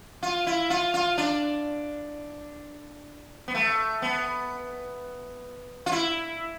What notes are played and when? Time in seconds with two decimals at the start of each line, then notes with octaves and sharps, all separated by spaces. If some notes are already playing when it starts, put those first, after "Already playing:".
0.23 F4
0.47 E4
0.70 F4
0.94 F4
1.18 D4
3.48 B3
3.55 A3
4.02 B3
5.86 F4
5.92 E4